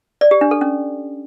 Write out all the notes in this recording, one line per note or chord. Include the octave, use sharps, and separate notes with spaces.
D5
G4
D4
A4
C#4